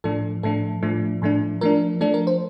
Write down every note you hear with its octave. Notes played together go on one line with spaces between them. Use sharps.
A2 F3 A3 D4 A4
A2 F3 A3 D4 A4
A2 F3 A3 D4
A2 F3 A3 D4
F3 A3 D4 A#4
F3 A3 D4 A4
A#4
C5